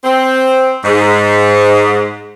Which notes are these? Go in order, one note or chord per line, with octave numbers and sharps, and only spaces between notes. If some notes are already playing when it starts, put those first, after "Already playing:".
C4
G#2